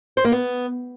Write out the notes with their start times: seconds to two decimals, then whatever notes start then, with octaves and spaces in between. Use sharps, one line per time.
0.17 C5
0.25 A#3
0.32 B3